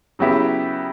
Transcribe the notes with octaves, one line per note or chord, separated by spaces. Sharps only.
C#3 F#3 B3 E4 G4